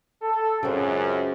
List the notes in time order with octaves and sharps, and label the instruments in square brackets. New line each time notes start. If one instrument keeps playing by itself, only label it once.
[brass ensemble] A4
[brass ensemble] C#2 F#2 [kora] C#3 C4